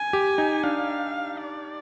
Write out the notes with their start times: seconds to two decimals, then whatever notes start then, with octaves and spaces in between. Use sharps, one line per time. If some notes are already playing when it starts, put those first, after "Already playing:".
Already playing: G#5
0.13 G4
0.38 D#4
0.64 D4 F5
1.38 D5